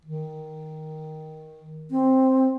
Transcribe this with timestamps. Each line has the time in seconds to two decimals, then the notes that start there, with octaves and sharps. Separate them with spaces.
0.05 D#3
1.91 C4